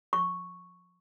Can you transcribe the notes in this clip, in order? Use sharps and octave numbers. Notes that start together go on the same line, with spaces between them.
C#6